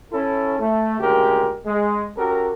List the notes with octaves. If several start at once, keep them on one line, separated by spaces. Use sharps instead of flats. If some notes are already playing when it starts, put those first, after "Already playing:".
C#4 E4 A4
A3
D2 A#2 C#3 G#3 G4 A#4
G#3
C#4 F#4 G4 A4 A#4